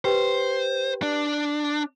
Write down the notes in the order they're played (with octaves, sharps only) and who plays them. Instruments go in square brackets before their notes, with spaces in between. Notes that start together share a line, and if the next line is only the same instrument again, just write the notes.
[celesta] G4 B4 G5 [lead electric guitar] C5
[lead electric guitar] D4